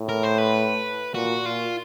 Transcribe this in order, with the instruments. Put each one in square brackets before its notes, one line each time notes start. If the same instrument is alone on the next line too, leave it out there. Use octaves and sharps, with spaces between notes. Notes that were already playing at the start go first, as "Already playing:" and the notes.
Already playing: [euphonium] A2
[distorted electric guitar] A#4
C5
B4
[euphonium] A#2 [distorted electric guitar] F#4
[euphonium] A#2 [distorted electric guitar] F4